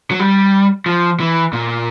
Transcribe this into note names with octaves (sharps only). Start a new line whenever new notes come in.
F#3
G3
F3
E3
A#2